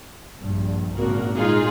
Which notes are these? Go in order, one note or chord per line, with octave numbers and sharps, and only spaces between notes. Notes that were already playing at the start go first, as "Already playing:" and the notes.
A#1 G2
G#1 A#2 C#3 A#3 F#4 A#4
A#2 G#3 D#4 F4 G#4